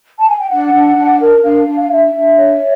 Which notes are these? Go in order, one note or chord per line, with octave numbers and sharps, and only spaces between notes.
A5
G#5
G5
D4 F#5
D4
D4
A#4
D4 F5
D4
F5
D4 E5
D4
C#5